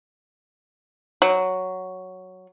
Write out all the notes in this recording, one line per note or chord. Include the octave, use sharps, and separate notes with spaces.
F#3